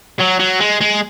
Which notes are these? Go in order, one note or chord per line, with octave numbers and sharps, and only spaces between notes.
F#3
F#3
G#3
G#3